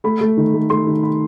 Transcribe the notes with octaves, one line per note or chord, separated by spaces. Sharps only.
A3 B5
A3
D#3
A3
A3 C6
D#3
B5